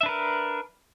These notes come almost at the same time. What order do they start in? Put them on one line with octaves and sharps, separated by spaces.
E5 D4 B4 A#4